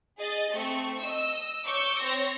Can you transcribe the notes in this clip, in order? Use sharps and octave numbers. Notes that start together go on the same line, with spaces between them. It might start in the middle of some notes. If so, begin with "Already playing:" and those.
G#4 D#5 A6
A3 C4 C#6
D#5 E6
C#5 C#6 D6 E6 G6
C4 C#5 A#6